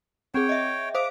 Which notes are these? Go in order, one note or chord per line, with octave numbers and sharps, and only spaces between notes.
C4 G#4 C#5 G5
D#5 E5
C5 F5 D6 D#6